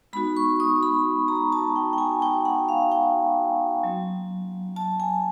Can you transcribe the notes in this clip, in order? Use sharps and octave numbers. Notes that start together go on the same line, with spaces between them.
G#3 B3 D#4 F#4 B5
C#6
D#6
B5
A#5
A5
G5
G5
G#5
G5
F#5
F5
G5
F#3 A#3 C#4
A5
G#5